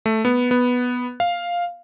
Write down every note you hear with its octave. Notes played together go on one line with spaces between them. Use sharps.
A3
B3
B3
F5